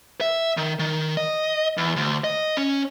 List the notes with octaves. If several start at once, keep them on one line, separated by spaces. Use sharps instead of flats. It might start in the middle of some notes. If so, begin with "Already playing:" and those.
E5
D#3
D#3
D#5
E2
D2
D#5
C#4